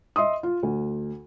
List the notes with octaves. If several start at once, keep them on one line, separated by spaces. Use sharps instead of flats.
D#5 E5 C6 D#6
F4
D2